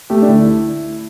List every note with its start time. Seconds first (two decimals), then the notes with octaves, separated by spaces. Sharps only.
0.10 A3 G4
0.22 D4
0.28 D2 E4